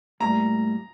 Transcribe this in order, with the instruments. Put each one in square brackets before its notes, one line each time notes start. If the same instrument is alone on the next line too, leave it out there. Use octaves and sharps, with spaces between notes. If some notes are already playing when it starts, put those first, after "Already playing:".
[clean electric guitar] A2 G3 A#3 [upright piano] A#5